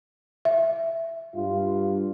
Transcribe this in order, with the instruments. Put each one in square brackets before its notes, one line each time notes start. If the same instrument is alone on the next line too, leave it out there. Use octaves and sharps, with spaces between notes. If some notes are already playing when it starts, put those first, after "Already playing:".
[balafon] E5
[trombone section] G2 F4